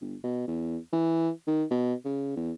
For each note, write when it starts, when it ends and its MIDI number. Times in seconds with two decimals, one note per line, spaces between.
0.02 0.16 31
0.24 0.44 47
0.48 0.77 40
0.93 1.30 52
1.47 1.64 51
1.71 1.94 47
2.05 2.32 49
2.36 2.52 40